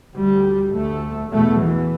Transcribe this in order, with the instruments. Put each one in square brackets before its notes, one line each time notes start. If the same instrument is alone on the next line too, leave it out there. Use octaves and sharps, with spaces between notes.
[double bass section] D2 G3
D2 A3
E2 B2 A3
E3